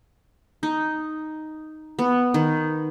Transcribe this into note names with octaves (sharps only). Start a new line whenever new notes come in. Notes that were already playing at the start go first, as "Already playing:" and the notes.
D#4
B3
D#3